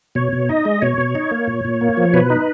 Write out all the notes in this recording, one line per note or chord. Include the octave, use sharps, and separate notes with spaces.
B2 C#5
B2
D#4 D#5
G#3
B2 C#5
B2
D#4
A#3
A#2
A#2
A#3
F3
B2 B4
D#4